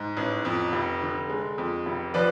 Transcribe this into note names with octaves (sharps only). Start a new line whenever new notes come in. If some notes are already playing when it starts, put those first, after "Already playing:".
Already playing: G#2
A1
F2
F1
D3
G#3
F2
F1
F3 B4 D5